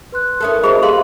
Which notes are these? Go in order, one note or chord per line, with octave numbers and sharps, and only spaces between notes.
B4 C6 F#6
C#4 E4 A4 A#4 D#6
A#3 F#4 G#4 A#4 C5 D#5 B5
G4 B4 E5 F5 C6